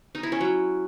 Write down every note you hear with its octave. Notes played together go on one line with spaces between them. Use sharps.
D#4
E4
C#4
F#3